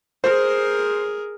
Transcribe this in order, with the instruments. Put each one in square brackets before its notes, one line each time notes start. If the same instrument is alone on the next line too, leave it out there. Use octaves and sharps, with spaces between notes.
[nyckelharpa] G#4 A#4 [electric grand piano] C5